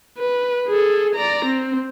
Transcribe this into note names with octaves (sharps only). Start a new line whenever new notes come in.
B4
G#4 A4
D5 A#5
C4